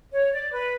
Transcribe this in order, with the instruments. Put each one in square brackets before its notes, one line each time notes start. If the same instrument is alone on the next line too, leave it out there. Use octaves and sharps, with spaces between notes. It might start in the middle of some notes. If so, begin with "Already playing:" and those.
[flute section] C#5
D5
B4